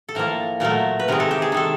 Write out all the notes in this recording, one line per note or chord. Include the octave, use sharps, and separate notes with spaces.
A4
A2 F3 A#3 A#4
A#2 F#3 A3 A#4
B4
C3 D#3 G#3 A#4
A4
G4
G#4
D#3 G#3 A4